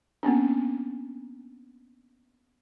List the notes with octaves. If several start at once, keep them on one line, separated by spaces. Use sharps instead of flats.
A#3 B3 C#4 D4